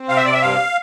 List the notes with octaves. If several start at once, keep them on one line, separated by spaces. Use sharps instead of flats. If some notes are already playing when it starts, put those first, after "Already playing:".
Already playing: C4
C3 F5
E5
C3 D5
E5
G2 F5